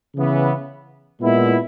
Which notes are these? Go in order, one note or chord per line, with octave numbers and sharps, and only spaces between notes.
C#3 E3 B3
A#2 G#3 B3 E4